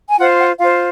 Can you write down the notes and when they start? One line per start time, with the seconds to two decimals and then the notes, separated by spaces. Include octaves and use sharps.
0.08 G#5
0.19 F4 C5 F#5
0.39 F#5
0.60 F4 F5
0.64 C5